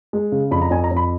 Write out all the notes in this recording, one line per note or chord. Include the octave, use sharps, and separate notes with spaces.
G#3
C#3
F2 B5
A#5
F2 G#5
A#5
F2
B5